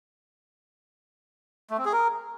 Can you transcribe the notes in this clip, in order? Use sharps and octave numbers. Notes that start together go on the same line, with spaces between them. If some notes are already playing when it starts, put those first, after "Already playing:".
A3
C4
G#4
A#4